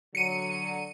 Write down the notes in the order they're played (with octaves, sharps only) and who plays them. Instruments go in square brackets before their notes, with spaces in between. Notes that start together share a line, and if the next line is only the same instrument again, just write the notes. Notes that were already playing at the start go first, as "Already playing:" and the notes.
[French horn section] D3 F#3 [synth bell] C#7 D#7